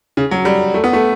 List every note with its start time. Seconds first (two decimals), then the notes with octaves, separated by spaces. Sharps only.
0.17 C#3
0.31 F#3
0.45 G3
0.74 A3
0.84 B3
0.93 A3